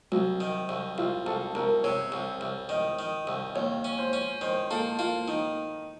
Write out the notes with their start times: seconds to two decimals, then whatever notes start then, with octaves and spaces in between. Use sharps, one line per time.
0.12 C2 F#3
0.40 D#3
0.69 C2
0.98 C2 F4
1.26 C2 A4
1.55 C2 A#4
1.84 C3 C#5
2.12 C2
2.41 C2
2.69 D#3 D#5
2.99 D#3
3.27 C2
3.55 D#2 C#5
3.84 C#4
3.98 C5
4.13 C#4
4.41 D#3 C5
4.70 A#3 A4
4.99 A#3 F4
5.27 D#3 D#4